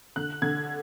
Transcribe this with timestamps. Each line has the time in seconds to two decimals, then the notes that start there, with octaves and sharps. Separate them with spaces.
0.16 D3 F#6
0.42 D3 G#6